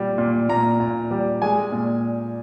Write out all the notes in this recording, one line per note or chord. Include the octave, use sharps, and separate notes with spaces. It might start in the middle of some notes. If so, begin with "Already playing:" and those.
Already playing: A#2 G3
A#2
A#2 A#5
A#2
G3
G#3 G#5
A#2